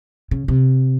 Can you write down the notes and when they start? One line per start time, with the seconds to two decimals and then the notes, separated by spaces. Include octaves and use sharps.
0.31 C#3
0.48 C3